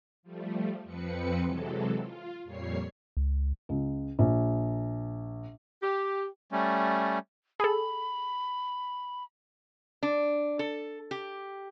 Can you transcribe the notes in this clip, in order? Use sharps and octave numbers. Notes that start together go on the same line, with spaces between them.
F3 G3 A3
F2 F3 C4 B4 C#7
C3 E3 F#3 G#3 A4
F4
F2 A#2 G3 C#5 C7
C#2
C#2
A#1
G4
G3 A3 C#4
G#4 A4 B5
D4
A4
G4